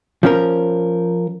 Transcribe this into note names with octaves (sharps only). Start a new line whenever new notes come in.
F3 C#4 A#4